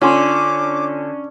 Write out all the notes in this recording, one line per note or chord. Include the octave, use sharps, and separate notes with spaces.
D3 C#4 F4 G#5 C6 D6